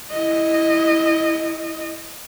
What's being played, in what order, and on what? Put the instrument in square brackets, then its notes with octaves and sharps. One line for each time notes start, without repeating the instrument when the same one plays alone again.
[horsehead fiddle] E4 D#5